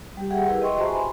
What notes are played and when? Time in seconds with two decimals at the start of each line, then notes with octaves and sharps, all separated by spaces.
0.17 G3 G4
0.30 G4 G#4 E5 F#5 G5
0.48 E4 G4 G#4 A#4 B4
0.62 D#5 G5 C6 C#6
0.77 F#4 C5 E5 A5 A#5
0.89 G#5 B5 C6